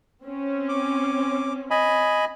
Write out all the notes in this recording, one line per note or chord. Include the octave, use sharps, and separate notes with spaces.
C4 C#4
D6
D#5 G#5 B5